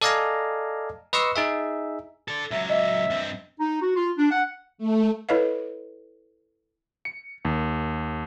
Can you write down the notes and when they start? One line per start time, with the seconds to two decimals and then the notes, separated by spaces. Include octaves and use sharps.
0.01 A4 D5 D#5 F5 G#5 A#5
1.13 B4 D#5 C6 C#6 E6
1.36 D#4 G#4 E5
2.28 A4 D5
2.51 C#2 F#3 E5
2.70 D#5 E5
3.10 G2 C4
3.59 D#4
3.81 F#4
3.96 F4
4.17 D4
4.31 F#5
4.78 A3
5.29 E4 A4 B4 C#5 D#5 F5
7.05 C#7
7.45 D#2